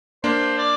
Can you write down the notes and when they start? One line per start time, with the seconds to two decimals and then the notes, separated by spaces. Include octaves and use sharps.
0.24 A#3 D4 C5
0.58 D5